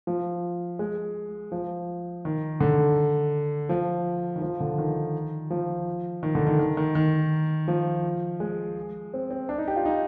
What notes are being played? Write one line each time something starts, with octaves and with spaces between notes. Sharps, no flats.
F3
G#3
F3
D#3
D3
F3
D#3
F3
D3
D#3
F3
D#3
D3
D#3
D#3
D#3
D#3
F3
G#3
C4
C4
D4
D#4
G4
F4
D#4